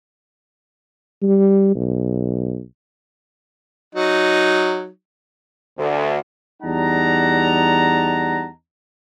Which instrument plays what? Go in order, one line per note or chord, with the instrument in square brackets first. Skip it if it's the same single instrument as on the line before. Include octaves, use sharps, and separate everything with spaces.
[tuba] G3
B1
[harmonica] F#3 D#4
[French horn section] D2
[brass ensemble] E2 G3 D#4 F#5 A5 A#5